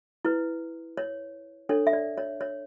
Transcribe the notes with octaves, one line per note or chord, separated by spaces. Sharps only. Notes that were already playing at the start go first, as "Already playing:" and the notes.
E4 B4
C#5
D4 A4 C#5
E5
D5
C#5
C#5